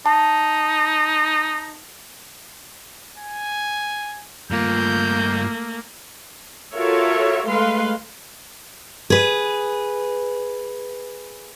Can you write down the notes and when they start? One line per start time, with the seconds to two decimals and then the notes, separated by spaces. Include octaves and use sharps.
0.06 D#4 A5
3.18 G#5
4.51 G2 A3 A#3 F4 G6
6.74 F4 F#4 A4 A#4 C#5 E5
7.46 G#3 A3 B4 F5 C6
9.10 G#4 B4